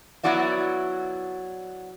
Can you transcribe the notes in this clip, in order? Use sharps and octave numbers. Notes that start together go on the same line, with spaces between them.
F#3 B3 E4 F#4 D5 E5